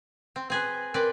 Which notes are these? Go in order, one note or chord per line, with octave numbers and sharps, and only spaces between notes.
C4
C4 G#4 B4
C4 A#4 B4 D5